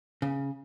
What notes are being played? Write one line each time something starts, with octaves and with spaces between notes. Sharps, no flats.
C#3